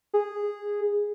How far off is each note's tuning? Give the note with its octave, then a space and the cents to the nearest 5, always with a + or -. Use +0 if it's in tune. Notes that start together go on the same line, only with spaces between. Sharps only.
G#4 -10